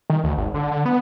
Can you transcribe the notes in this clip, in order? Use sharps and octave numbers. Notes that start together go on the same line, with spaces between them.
D#3
D2
G#1
D3
D3
B3